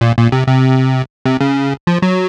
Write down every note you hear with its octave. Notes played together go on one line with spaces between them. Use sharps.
A#2
A#2
C3
C3
C3
C#3
F3
F#3